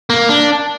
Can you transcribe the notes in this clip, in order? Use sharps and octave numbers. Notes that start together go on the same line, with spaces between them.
A#3
D4